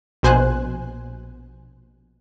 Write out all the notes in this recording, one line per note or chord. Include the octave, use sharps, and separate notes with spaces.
A#1 B2 C5 G#5 F#6